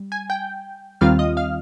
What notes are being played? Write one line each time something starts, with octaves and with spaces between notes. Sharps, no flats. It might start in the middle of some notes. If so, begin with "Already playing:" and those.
Already playing: G3
G#5 G#6
G5 G6
D#2 D#3 G3 C4 F4 F5 F6
D#5 D#6
F5 F6